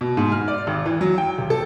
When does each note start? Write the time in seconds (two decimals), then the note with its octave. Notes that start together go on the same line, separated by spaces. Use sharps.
0.01 B2
0.17 G#2
0.32 F6
0.48 D5
0.67 G#1
0.85 E3
1.01 F#3
1.18 G5
1.38 D#1
1.50 A4